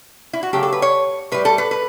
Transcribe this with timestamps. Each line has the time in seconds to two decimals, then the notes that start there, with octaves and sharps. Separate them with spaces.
0.33 E4
0.43 F#4
0.53 C#3 F#3 A3 G4
0.63 A4
0.73 B4
0.82 C#5
1.32 A2 G3 B4
1.45 A4
1.58 B4
1.71 B4